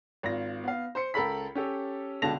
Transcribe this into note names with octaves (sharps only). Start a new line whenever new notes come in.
G#1 F4 A#6
B3 F5
C5 C6 C#7
C#2 A4 A#4 B5 B6
C#4 G4 A4
C#2 B2 D3 A5 A#6 F7